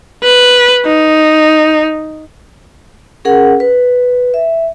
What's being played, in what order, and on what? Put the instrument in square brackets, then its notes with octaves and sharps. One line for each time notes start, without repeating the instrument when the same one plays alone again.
[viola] B4
D#4
[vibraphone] C#4 G#4 A#4 F#5
B4
E5